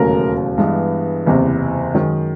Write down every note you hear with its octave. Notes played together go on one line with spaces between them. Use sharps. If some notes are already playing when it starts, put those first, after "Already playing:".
Already playing: E1 D#2 C#3 F#3 A3 A#4
G2 E3 G#3 B3
F#1 E2 C3
F#2 D#3 G#3